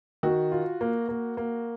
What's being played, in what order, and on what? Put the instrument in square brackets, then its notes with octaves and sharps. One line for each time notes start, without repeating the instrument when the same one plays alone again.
[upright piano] D#3 [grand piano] F#4
[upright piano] F4
A#3
A#3
A#3